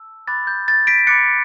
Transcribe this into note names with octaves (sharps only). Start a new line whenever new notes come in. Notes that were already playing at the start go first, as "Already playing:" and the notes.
Already playing: A5 E6
B5 D6 F#6 A6
G6
A6
B6 D7
B5 D6 F#6 A6 C#7